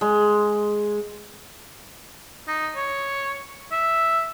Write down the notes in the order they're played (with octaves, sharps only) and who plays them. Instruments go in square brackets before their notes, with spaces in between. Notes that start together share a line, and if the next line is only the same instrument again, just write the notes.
[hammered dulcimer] G#3
[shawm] D#4
C#5
E5